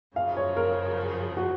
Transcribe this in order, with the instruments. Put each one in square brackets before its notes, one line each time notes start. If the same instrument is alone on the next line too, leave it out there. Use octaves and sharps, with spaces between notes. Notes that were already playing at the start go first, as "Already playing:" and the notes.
[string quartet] F#2 C#3 F3 [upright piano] F5
[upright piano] C#5
A#4
F#4